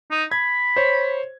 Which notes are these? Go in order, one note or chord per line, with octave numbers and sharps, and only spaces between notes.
D#4
B5 G#6
C5 C#5